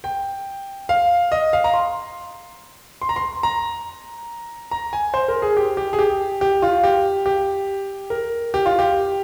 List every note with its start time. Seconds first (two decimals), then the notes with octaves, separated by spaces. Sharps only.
0.04 G5
0.89 F5
1.32 D#5
1.53 F5
1.64 A#5
1.74 C6
3.01 C6
3.09 A#5
3.16 C6
3.43 A#5
4.71 A#5
4.93 G#5
5.14 C5
5.28 A#4
5.42 G#4
5.57 G4
5.77 G4
5.93 G#4
5.99 G4
6.41 G4
6.62 F4
6.84 G4
7.26 G4
8.10 A#4
8.54 G4
8.66 F4
8.79 G4